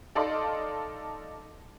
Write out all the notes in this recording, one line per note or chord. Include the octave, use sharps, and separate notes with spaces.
D#4 A4 D5 D#5 F5 C6